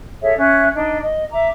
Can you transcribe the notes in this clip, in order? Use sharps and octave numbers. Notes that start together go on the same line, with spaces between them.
G#4 A4 C#5 E5
C#4 E5 F#6
D4 D#4 D#5
D#5
E5 A#5 D6